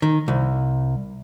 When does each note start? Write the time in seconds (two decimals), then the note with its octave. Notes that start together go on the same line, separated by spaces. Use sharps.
0.02 D#3
0.28 C2